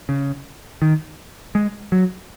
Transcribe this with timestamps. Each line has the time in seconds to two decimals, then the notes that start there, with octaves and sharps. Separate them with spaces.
0.09 C#3
0.82 D#3
1.55 G#3
1.92 F#3